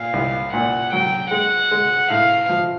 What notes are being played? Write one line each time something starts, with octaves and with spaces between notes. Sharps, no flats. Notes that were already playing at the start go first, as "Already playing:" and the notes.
Already playing: A#2 F5
C2
A#2 F#5
F#3 G5
G#3 F#5
G#3
A2 F5
F3